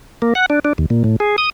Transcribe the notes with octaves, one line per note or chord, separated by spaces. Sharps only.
A#3
F#5
D4
D4
D#2
A#2
A2
G#4
D#6